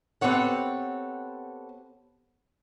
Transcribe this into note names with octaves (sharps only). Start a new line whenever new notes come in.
B3 C4 G4 A4 C#5 F#5